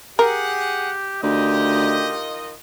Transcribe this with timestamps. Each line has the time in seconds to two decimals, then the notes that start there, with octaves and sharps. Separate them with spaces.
0.19 G4 G#4 A#4 F#5
1.23 D2 D#3 F4 G4 D#5